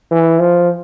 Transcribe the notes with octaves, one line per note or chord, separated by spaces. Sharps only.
E3
F3